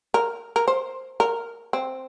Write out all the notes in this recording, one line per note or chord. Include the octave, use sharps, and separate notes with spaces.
A#4
A#4
C5
A#4
C4